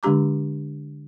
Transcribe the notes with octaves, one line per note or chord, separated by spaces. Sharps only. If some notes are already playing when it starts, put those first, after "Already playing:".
D3 G#3 D4 G4 A#5 D6